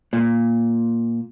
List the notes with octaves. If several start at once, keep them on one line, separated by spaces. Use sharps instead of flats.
A#2